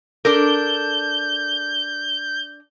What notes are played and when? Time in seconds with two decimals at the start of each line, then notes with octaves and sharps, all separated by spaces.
0.25 D4 A4 A#4 G6